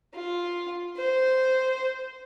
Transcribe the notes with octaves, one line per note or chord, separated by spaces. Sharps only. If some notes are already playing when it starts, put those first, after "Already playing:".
F4
C5